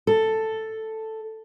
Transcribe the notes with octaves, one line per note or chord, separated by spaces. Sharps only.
A4